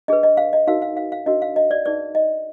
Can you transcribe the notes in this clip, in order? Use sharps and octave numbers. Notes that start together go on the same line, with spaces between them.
D4 G#4 B4 D#5
D#5
F5
D#5
D#4 F#4 A#4 F5
F5
F5
F5
D4 F#4 A#4 D#5
F5
D#5
D5
D#4 G#4 B4 D5
D#5